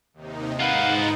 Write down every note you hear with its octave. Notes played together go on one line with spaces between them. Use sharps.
D#2 C3 D#4
G#2 D#4 F4 B4 F5 F#5